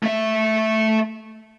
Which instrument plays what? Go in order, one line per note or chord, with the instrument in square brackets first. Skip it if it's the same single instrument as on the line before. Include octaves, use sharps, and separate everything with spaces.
[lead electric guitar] A3 E5